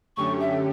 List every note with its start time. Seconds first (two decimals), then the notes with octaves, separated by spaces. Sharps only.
0.17 F#2 D3 A3 C#4 G4 C#6
0.40 E5